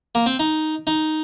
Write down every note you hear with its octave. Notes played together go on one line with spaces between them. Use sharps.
A#3
C4
D#4
D#4